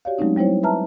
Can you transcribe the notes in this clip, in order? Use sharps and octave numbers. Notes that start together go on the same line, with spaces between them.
F#4 G4 C#5 D5 F5
F#3 G#3 A3 C4 C#4 D#4
F#3 G3 C4 E4 C5 C#5
B4 E5 A5 A#5 F6